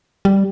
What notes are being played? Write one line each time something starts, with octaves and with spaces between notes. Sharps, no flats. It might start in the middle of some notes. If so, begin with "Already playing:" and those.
G3